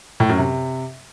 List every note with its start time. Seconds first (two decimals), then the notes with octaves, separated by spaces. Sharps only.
0.20 A2
0.29 F#2
0.39 C3